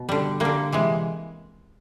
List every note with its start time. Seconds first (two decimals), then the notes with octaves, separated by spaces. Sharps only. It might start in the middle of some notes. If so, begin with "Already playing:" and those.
Already playing: B2
0.09 D3 G3
0.40 D3 G3 A#3
0.72 C3 E3 G#3